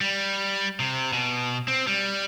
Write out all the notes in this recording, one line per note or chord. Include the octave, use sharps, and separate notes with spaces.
G3
C3
B2
C4
G3